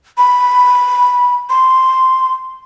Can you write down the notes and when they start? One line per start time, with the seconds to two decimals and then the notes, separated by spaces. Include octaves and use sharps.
0.18 B5
1.50 C6